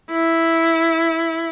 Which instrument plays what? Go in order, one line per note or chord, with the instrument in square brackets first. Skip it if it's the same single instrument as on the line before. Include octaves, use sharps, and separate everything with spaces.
[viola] E4